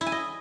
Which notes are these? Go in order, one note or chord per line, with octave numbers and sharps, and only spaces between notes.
E4
G#5
D#5